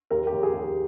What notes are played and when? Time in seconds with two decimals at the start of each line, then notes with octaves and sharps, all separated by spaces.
0.10 D#2 A#4
0.27 G4
0.33 D#2
0.43 G#4
0.54 D#2
0.59 G4